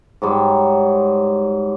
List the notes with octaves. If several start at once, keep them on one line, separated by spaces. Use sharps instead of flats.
G#2 F#3 G3